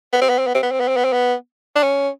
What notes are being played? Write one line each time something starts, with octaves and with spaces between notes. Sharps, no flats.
B3
C4
B3
C4
B3
C4
B3
C4
B3
C4
B3
C4
B3
D4
C#4